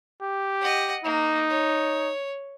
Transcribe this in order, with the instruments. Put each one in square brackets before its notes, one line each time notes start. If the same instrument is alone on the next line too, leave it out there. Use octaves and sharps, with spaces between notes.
[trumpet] G4
[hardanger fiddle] D#5 F#5
[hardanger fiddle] A#3 [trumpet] D#4
[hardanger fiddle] C#5